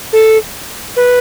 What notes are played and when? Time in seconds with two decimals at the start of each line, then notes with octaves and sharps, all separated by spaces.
0.13 A4
0.96 B4